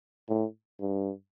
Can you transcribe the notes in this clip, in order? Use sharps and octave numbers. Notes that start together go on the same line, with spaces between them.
A2
G2